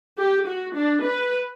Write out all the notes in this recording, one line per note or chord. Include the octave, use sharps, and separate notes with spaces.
G4
F#4
D4
B4